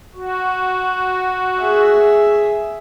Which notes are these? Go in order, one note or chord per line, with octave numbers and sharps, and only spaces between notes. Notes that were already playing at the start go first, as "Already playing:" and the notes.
F#4
G#4 E5